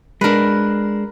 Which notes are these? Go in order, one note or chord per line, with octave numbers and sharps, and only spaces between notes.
G#3 D4 A#4 B4